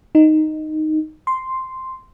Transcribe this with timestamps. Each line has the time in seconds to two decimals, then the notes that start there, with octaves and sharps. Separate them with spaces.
0.15 D#4
1.27 C6